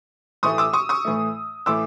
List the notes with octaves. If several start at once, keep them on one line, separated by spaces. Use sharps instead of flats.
A2 E3 A3 C#6 D#6
D6 E6
C#6 D#6
C#6 D#6
A2 E3 A3
A2 E3 A3 D6 E6